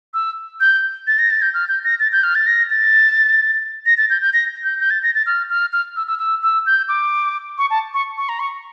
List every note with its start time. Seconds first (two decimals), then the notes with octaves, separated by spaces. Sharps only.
0.14 E6
0.61 G6
1.07 A6
1.19 A#6
1.30 A6
1.42 G6
1.54 F6
1.68 G6
1.84 A#6
2.00 A6
2.12 G6
2.24 F6
2.35 A6
2.47 A#6
2.70 A6
3.86 A#6
3.98 A6
4.10 G6
4.22 G6
4.33 A#6
4.64 G6
4.80 G6
4.90 A6
5.03 A#6
5.15 A6
5.26 F6
5.50 F6
5.73 F6
5.96 E6
6.07 E6
6.19 E6
6.43 E6
6.66 G6
6.89 D6
7.58 C#6
7.70 A5
7.94 C#6
8.17 C#6
8.29 A#5
8.40 C#6